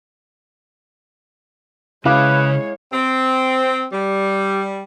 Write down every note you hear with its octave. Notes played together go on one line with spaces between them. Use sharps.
C#3 G#3 E4 B4 C#5 F5 D6
C4
G3